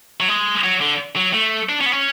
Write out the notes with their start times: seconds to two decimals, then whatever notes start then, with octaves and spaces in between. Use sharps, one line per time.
0.20 F#3
0.29 G#3
0.64 F#3
0.81 D3
1.16 F#3
1.34 A3
1.69 D4
1.81 C#4
1.86 B3
1.92 C#4